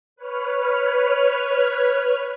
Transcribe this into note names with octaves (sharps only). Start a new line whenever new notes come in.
B4 C#5 F6